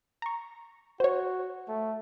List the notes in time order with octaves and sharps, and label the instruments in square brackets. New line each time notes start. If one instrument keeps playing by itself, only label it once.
[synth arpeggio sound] A#5 C#6
[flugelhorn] F#4 [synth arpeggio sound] C5 C#5
[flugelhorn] A3